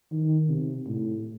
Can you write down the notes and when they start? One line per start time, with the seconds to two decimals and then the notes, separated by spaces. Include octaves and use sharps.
0.12 D#3
0.49 C3
0.87 A2